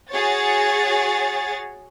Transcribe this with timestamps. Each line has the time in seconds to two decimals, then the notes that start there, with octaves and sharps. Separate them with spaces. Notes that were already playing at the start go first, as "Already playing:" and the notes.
0.11 F#4 G#4 C#5 A6